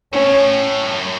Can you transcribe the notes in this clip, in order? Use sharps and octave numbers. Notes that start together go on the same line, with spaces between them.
A2 C#4
B2
A2
G2
F#2